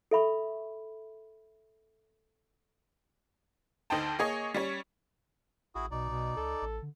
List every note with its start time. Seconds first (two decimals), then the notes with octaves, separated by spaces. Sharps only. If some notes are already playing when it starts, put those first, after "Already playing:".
0.11 A4 E5 B5 C#6
3.90 D2 D#4 A4 C5 G5 A5
4.19 A#3 G#4 C#5 D#5
4.55 G3 C#4 C#5
5.75 A1 E4 F#4 G#4
5.91 B1 B2 D#4 D5
6.10 B2
6.37 C#2 A4
6.62 A1
6.82 D3